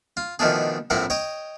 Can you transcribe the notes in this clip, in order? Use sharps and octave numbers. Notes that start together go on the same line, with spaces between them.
F4
B2 D#3 F3 A3 D4 G#4
A#1 A2 C4 E4 A#4 F#5
C#5 D#5 G5